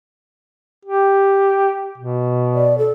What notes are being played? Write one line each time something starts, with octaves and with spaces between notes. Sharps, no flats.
G4
B2
D5
A4